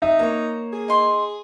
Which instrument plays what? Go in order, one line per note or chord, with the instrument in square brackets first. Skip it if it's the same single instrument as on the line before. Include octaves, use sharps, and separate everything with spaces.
[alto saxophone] D#4 [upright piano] E5
[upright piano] A#3 [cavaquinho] C#5 A#5
[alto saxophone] G#4
[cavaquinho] D#4 C6